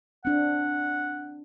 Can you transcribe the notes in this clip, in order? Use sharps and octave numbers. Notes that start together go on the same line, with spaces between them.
C4 D4 F#5